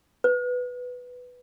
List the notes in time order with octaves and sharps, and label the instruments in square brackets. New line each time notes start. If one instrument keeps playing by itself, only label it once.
[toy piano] B4